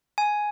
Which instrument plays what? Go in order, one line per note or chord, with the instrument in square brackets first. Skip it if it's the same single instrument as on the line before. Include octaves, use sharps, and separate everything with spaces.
[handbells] G#5